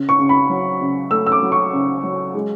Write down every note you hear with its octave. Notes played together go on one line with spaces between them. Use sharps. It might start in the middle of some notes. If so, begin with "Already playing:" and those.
Already playing: C#3
C#6
C#3
B5
F#3
C#3
A3 E6
E6
D6
F#3
C#6
C#3
F#3
G#3